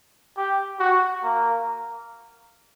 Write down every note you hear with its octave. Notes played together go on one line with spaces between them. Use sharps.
G4
F#4
A#3